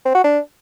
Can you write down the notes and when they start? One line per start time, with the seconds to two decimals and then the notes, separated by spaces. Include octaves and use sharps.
0.05 C4
0.15 F#4
0.24 D4